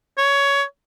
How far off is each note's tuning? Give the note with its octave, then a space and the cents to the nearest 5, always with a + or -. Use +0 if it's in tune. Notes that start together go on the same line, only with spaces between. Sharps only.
C#5 +15